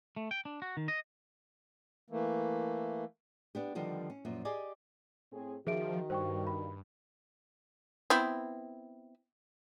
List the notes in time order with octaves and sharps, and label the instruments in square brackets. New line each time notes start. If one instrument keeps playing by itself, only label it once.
[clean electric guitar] A3
G5
D4
F#4
D#3
D#5
[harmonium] E3 A3 A#3
[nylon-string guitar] B3 D4 G4
D3 D#3 F3 G3 B3
C#4
F#2 A#2 F3
G4 G#4 D5 D#5 G#5
[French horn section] A2 C4 G#4
[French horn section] D#3 F#4 [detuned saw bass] F3 [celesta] G#4 E5 D7
[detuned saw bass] G2 [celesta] C5 G5 C#6
[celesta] B5
[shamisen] B3 C4 E4